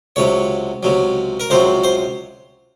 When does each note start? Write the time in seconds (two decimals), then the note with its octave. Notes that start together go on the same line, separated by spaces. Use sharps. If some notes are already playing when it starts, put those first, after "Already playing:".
0.16 C#2 C3 F#3 C#5
0.83 C#2 C3 F#3
1.40 A#4
1.50 C#2 C3 F#3 C5
1.84 C5